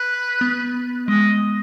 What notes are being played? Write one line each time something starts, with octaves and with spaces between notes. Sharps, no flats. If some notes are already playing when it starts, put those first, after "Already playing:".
Already playing: B4
B3
G#3 D#5